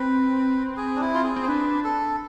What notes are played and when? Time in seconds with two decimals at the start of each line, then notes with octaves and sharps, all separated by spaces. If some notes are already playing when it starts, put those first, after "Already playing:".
Already playing: C4 B4
0.77 G#4
0.96 D4
1.01 E4
1.14 F4
1.24 G#4
1.36 C4
1.43 C5
1.48 D4 B4
1.84 A4